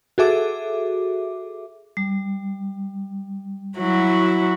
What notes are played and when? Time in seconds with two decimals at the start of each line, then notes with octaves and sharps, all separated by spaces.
0.18 F#4 G#4 A4 E5 D6
1.97 G3
3.78 F#3 E4 F#4